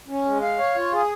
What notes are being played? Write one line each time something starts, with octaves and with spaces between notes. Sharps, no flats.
C#4
G#3
F5
C#5
F4
G#4